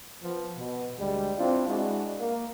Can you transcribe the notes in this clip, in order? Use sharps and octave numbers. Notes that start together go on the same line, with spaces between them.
F3 B3
B2
D2 G3 G#3
C4 D4 E4 F4
G#3 D4 E4 F#4
A#3